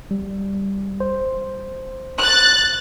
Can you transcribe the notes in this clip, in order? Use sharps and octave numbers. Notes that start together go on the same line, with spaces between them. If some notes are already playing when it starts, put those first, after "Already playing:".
G3
C5
F#6 A6